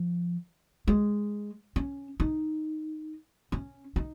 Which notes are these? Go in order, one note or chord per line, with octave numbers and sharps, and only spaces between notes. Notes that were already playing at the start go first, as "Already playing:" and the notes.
Already playing: F3
G#3
C#4
D#4
C#4
D#4